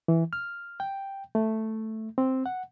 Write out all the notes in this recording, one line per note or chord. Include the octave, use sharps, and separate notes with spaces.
E3
F6
G5
A3
C4
F#5